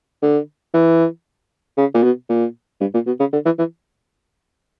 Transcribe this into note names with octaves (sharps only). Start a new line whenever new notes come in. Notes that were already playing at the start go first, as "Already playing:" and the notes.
D3
E3
C#3
A#2
B2
A#2
G2
A#2
B2
C#3
D3
E3
E3